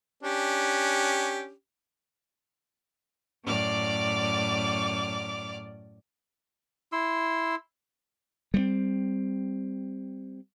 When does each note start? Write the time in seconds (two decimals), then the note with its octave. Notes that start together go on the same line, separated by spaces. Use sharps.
0.23 C#4 D4 G4
3.44 F#2 A2 D5 D6 F6
6.92 E4 C6 E6
8.54 G3 G#3 C4